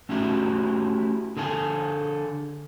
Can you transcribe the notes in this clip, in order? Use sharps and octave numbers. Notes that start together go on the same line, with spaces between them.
A3 C#4 E4 F#4 G4
D3 G#4 A4 F#5 G#5